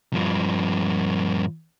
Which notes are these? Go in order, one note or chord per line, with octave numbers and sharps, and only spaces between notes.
G2 F3